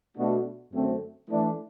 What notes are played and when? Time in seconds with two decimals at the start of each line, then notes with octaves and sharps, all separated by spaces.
0.17 B2 A3 D4 F#4
0.72 F#2 D3 A3 C4
1.29 E3 A3 D4